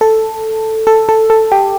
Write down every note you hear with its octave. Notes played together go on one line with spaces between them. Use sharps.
A4
A4
A4
A4
G4